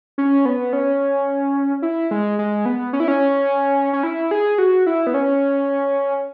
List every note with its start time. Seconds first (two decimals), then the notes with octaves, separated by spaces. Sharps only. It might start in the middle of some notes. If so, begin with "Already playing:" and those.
0.18 C#4
0.46 B3
0.73 C#4
1.82 E4
2.11 G#3
2.39 G#3
2.65 B3
2.93 C#4
3.00 E4
3.08 C#4
3.93 C#4
4.03 E4
4.31 G#4
4.58 F#4
4.86 E4
5.07 B3
5.14 C#4